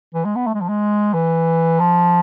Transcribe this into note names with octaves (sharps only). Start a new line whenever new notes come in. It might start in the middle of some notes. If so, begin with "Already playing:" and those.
E3
G#3
B3
A3
G#3
F3
G#3
E3
F3